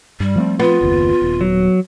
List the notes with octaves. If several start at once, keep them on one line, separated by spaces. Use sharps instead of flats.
G2 G3
F3 A3 C4
B3 F4
F#1 D#2
D#1
F#3